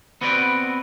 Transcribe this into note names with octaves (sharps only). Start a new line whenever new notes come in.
B3 C4 F#4 B4 C#5 D5